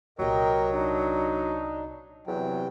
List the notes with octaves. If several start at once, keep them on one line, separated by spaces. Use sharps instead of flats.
C2 A#2 F#3 G4 A#4 D#5 G5
D4 D#4
E2 C3 F#3 G5